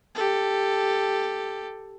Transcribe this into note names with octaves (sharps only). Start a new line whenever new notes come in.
G4 A4